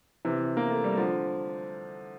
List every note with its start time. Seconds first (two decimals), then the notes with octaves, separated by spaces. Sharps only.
0.25 C3 E3
0.57 A#3
0.71 A3
0.84 G3
0.97 D3 F3